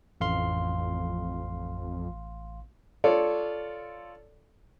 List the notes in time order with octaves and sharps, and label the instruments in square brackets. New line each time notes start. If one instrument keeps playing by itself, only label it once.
[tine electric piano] A1 F5 C6 [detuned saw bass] F2
[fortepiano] F4 A4 C#5 D5